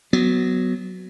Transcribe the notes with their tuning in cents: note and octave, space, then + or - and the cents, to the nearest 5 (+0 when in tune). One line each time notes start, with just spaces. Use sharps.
F#3 +0 B3 +5